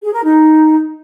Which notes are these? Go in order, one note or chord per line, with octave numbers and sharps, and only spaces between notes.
G#4
A#4
D#4